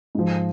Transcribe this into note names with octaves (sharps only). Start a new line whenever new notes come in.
G#2 F3